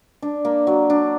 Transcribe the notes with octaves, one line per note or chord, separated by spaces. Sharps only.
D4
A#3
F#3
D4